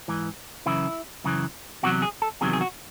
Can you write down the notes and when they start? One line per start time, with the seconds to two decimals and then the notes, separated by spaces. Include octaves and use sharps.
0.08 G#2 E3
0.66 F#2 C#3 E3 E4
1.24 F#2 C#3 E3
1.83 E2 C3 D#3 F#3 F#4
2.02 G#4
2.22 A4
2.41 E2 C3 D#3 F#3 G#4
2.53 G#4
2.61 F#4